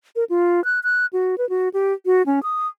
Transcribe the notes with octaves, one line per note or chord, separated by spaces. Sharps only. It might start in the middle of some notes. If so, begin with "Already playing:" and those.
A#4
F4
F#6
F#6
F#4
B4
F#4
G4
F#4
C#4
D#6